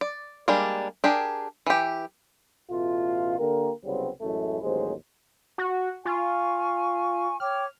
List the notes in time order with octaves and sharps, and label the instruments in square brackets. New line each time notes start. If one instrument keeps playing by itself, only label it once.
[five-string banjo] D5
G3 G#3 A#3 D4
D4 G4 G#4 A#4
E3 G4
[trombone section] A1 B2 A3 F4
D3 A#3 G4 A#4
C2 C#3 F#3 G3 B3 C4
A1 F#2 G#3 A3 E4
A1 D#2 F#3 G#3 C5
[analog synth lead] F#4
[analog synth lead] F4 [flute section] G#5 C#6
[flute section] C#5 G5 D6 [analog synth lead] F6